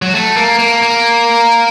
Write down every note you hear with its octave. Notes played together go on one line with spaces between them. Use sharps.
F#3
A3
A#3
A#3
A#3